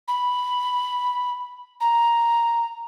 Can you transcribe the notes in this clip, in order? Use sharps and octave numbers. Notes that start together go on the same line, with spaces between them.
B5
A#5